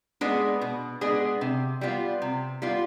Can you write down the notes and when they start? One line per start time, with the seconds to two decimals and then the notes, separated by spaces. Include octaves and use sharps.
0.21 G#3 B3 D4 G#4
0.61 B2
1.01 G#3 B3 D4 G#4
1.41 C3
1.81 G3 B3 F4
2.22 C3
2.62 G3 B3 F4